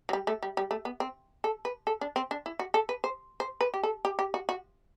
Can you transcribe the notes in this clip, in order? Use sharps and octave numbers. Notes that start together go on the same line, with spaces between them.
F#3
G3
A3
G3
G3
A3
B3
C4
A4
B4
A4
D4
C4
D4
E4
F#4
A4
B4
C5
C5
B4
G4
A4
G4
G4
F#4
F#4